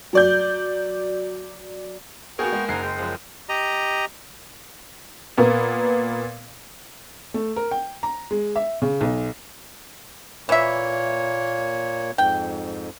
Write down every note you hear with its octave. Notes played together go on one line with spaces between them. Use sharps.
F#3 D5 G6
A#3 B3 F#4 G#4 A#4 G5 C#6
G#3
F#1 D#4 F#5 G#5 C7
G#3 G5
F#2 F3
G4 D#5 A#5
A#2 A#3 B3
A3
A#4
G5
A#5
G#3
E5
C#3
B1
A#2 E3 A#3 C#5 E5
F2 G#2 G5